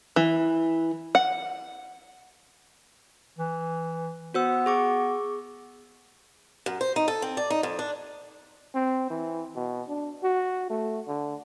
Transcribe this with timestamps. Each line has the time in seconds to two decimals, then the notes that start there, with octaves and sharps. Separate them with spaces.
0.16 E3
1.15 F#5
3.39 E3
4.34 B3 F#4 C5 E6
4.66 G#4 C#6 D6
6.66 F#2
6.81 C5
6.96 D#4
7.08 A4
7.22 C4
7.37 D5
7.50 D#4
7.63 F2
7.79 D4
8.75 C4
9.10 E3
9.55 B2
9.88 D4
10.23 F#4
10.70 A3
11.08 D3